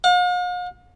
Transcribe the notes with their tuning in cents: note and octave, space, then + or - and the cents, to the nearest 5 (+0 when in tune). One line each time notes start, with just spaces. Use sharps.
F5 +45